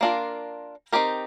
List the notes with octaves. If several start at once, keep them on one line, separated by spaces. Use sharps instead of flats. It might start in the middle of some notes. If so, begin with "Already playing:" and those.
A#3 D4 F4 A#4
C4 D#4 G4 A#4